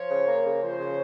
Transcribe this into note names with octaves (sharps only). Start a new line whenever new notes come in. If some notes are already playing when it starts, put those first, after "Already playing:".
Already playing: F3 C#5
C#3
A#3
C#3
F3 C5
C#3